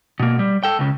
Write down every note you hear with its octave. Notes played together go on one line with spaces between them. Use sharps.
B2 A#3
G3
A4 G5
C#2 C#3